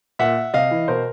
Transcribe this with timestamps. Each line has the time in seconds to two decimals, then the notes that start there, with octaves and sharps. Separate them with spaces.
0.19 A#2 E5 F#5
0.54 C3 D#5 F5
0.71 E3
0.88 B2 A#4 C5